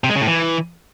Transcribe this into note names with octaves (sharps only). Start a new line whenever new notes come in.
C3
G#3
C#3
A2
E3